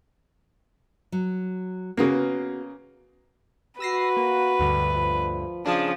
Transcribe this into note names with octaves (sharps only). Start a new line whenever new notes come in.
F#3
C#3 A#3 B3 F#4 A#4
F#4 B4 E6 A#6 C7
A#3
D2 G2 D3
F3
C#3 F3 D4 G#4 A5